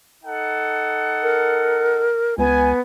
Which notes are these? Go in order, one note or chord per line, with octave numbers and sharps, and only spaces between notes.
D#4 A4 F#5
A#4
C#2 B3 G#5